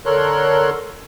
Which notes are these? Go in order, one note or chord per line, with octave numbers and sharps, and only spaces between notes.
D3 A4 A#4 C#5 C6 F#6